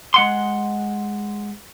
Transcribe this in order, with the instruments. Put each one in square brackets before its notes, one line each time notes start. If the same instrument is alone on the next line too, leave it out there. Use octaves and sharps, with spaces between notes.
[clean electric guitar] G#3 F#5 C6